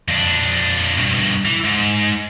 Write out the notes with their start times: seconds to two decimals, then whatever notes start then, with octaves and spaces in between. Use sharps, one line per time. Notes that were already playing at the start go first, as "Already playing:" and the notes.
0.08 F2 D4
0.98 G2 B2
1.45 E3
1.65 G#2